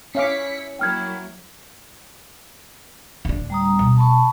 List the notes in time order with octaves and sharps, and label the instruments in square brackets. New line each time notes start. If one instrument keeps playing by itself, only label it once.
[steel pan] C#4 F5 D6 [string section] E4 B6 C#7
[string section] F#3 A#3 E4 [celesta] G5 F6 G#6
[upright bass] D1 D4
[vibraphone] G3 A#5 D#6
[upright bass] B2
[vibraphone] A5 B5 C#6